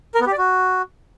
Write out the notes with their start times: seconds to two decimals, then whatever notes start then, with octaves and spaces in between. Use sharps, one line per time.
0.15 A#4
0.21 B3
0.26 G4
0.32 D5
0.38 F#4